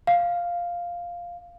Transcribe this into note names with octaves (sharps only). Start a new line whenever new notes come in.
F5